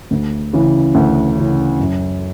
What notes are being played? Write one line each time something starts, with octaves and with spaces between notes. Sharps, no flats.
D2
C#3 E3
D2
C#3 E3
F#2